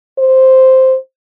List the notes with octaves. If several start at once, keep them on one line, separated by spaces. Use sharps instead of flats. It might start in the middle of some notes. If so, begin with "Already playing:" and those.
C5